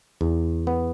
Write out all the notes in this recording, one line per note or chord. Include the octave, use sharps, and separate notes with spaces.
E2
B3